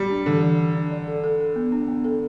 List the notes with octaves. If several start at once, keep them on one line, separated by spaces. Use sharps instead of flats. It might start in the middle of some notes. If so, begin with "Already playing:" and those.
Already playing: G3
D4
D3 E3
E3
E3
D4
D5
A4
A4
A4
B3
D4
B3
A4